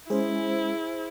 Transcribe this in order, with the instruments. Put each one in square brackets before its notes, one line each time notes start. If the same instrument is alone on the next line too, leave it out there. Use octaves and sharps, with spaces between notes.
[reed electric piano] G#3 C#4 [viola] E4 [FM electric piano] G#4 C5